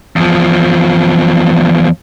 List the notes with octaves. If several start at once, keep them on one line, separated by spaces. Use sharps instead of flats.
E2 F3